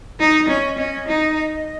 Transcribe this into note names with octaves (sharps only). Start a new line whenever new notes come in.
D#4
C#4 D#5
C#4 D#5
D#4